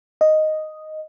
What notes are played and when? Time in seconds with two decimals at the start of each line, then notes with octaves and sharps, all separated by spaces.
0.21 D#5